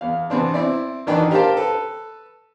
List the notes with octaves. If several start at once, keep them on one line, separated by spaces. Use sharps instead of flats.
E2 F5
C3 E3 B3 C4 D4
C4 E4 D5
A1 D#3 E3 D4 F#4 G5
G4 A#4 C5 F5 G5 A5
A4 B4